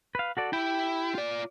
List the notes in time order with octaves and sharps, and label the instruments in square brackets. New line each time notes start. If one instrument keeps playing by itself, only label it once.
[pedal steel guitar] B4 F5
F#4 A4 D5
[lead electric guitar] E4 [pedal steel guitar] G4 G5
[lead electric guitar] F4 D5